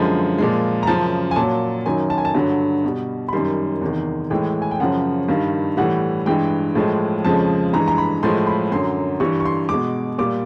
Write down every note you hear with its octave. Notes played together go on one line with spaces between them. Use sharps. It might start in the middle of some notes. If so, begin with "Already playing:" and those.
Already playing: F#2 D3 F3 G#3
A#2 F3 G#3
A#5
F#2 C#3 F3 A5
G#5
A#2 F#3 A5
F#2 D#3 F#3 G#5
A5
G#5
A5
G2 D3 F#3
B2 G3
B5
F#2 D#3 G3 C6
E2 C3 D#3
A2 E3 G#3 G5
G#5
G5
F#2 C#3 F3 F#5
G2 D#3 G3 F5
A2 E3 G3 F#5
G2 E3 G#3 G5
A2 F3 G#3
F2 C#3 F3 G#3 A5
G2 E3 G#3 A#5
A#5
B5
A2 F3 G#3 C6
B5
F#2 D3 F#3 C6
G2 E3 G3 C#6
C#6
C6
B2 G#3 D6
A#2 G3 D6